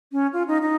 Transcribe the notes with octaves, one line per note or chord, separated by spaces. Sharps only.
C#4
F4
D#4
D#4